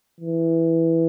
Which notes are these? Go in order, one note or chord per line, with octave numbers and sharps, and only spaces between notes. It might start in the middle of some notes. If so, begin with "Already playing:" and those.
E3